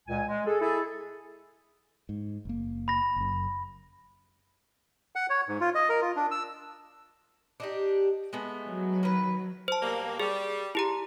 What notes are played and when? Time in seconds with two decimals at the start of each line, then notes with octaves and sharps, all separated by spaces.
0.08 C#2 A#2 G#5
0.28 G#3
0.46 G#4 A4
0.61 E4 G#4 A4
2.09 G#2
2.45 F#1 A#3
2.88 B5 A#6
3.16 F#1 F#2
5.16 F#5
5.30 C#5
5.48 G#2
5.61 F4
5.75 D#5
5.89 A#4
6.02 F4
6.16 D4
6.31 E6
7.60 D4 D#4 G4
8.33 G#3 A3 B3
8.66 F#3
9.03 D#3 B4
9.68 C5 A5
9.82 B2 G3 A#3
10.20 G3 G#4
10.75 E4 G4 A#5